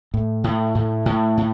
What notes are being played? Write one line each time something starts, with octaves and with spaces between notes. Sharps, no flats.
A2
A2
A2
A2
A2